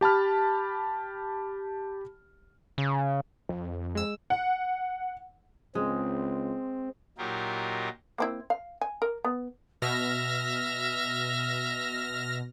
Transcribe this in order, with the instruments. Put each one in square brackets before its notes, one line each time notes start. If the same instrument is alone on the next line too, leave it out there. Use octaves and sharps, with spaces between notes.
[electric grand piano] G4 A5 B5 F6
[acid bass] C#3
[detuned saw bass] F2
[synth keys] G#3 E6
[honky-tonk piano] F#5
[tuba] C#2 [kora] G#3 [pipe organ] C4
[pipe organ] A#2 F#3 D#4 F4 G4 A#4
[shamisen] A#3 C4 E4
F5
G#5
A#4
B3
[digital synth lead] B2 [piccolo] E5 [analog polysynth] F6 A#6